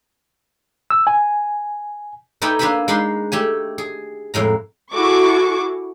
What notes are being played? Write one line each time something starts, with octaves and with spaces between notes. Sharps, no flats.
E6
G#5
A3 D#4 B4 D5 G5 G#5
A#3 D4 B4 E5 G#5 B5
G#3 D4 D#4 B5 C6
A3 G4 G#5
G#4
F2 A2 G#3 A#5
E4 F#4 G#4 A4 C#6 D6